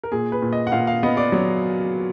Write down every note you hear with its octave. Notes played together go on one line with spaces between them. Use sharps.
A#4
A#2 G#4
B4
A#2
D#5
F#5
A#2 F5
F5
B3 D#5
D5
F#3